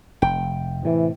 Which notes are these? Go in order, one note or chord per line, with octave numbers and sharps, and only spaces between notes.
F1 G5
A2 C3 E3